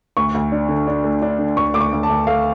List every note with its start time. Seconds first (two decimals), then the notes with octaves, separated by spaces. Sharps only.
0.17 D2 C#6
0.34 D2
0.52 D4
0.69 D3
0.87 D4
1.04 A3
1.22 D4
1.39 D3
1.57 D2 C#6
1.74 D2 D6
1.81 C#6
1.93 D2
2.03 A5
2.09 D2
2.27 A3 F5